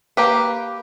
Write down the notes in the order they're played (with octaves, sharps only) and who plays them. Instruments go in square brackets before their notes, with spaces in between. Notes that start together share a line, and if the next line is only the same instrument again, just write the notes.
[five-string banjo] A#3 G4 B4